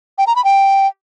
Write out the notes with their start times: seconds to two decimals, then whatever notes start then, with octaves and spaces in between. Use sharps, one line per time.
0.18 G5
0.27 A#5
0.36 B5
0.45 G5